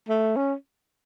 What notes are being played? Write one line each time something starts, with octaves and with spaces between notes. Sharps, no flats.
A3
C#4